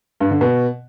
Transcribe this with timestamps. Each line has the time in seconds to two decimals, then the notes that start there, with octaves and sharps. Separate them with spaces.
0.20 G2
0.31 D3
0.41 B2